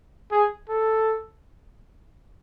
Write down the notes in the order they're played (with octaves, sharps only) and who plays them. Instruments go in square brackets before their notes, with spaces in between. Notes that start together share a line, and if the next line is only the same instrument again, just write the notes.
[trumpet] G#4
A4